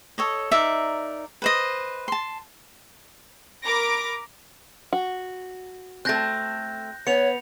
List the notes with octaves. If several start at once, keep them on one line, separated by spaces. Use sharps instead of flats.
A4 C#5 D#5
D#4 A#4 D5 E5
B4 C5 D#5
A5 C6
A#4 A#5 B5 D6 A#6 D7
F#4
A3 C4 F#6 G6 A#6
B3 C#5 C#7 F7